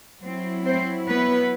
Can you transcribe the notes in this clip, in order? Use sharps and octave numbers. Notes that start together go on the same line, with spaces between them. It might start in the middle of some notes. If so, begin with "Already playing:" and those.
F#3 C4 E4
C4 C5
B3 B4